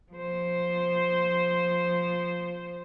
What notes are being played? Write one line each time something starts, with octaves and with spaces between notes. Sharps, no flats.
F3 C5